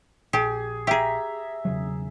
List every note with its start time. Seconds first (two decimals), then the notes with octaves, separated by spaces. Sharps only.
0.33 A#1 G4 G#4
0.87 G4 G#4 E5 A#5
1.65 E1 C#3 F#3